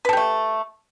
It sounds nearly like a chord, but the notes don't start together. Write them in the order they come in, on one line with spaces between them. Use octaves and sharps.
B4 A4 G4 A3